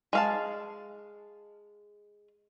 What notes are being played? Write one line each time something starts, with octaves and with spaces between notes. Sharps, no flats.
G#3 F5 A5